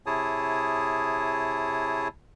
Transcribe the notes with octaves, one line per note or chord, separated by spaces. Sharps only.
C3 E4 G#4 C#5 A5 D#6